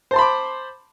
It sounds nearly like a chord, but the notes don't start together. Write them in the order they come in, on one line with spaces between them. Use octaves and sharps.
C5 A5 C6 B5 D6